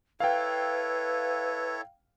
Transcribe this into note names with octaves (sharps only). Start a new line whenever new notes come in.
E4 A4 B4 C#5 F5 G5